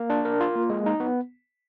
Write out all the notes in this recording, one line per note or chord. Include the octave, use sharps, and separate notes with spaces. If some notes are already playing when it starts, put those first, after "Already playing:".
Already playing: A#3
D4
A#4
F4
A#3
G#3
D#4
B3